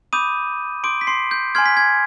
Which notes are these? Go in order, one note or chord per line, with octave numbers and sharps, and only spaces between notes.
B5 D6 D#6 G6 D#7
C6 D6 D#6 G6 D7
B6
C6 C7
G6
G#5 C6 F6 G#6
B6
G#6